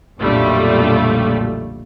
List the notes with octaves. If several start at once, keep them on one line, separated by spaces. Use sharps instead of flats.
B1 F2 A#2 D3 G3 A3